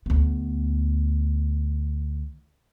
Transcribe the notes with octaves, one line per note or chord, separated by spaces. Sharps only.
D2 B3